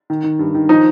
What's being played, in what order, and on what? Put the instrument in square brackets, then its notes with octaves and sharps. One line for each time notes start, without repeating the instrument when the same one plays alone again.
[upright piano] D#3
D#3
G2
D#3
F3 D#4